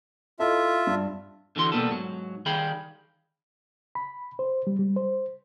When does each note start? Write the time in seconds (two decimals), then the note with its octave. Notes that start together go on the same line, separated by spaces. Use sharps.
0.40 E4 F4 A4 D#5 E5
0.87 G2
1.56 D3 E3 F#4 C6
1.72 B2 G3 A#3 B3 A4
1.90 G#2 F#3
2.46 D#3 G3 G#4 F5 G5 B5
3.95 B5
4.39 C5
4.67 G3
4.79 G3
4.96 C5